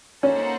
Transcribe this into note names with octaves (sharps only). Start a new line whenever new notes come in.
A#3 C#4 D#4 A4 C5 F#5